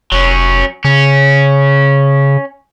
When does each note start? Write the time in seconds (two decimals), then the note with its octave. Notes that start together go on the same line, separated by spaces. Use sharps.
0.12 F1 F#3 C#4
0.85 C#3 C#4